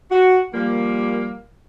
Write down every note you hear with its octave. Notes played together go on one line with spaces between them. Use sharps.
F#4
F3 G3 A#3